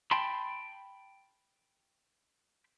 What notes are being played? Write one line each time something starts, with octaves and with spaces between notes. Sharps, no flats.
G5 A5 B5 C6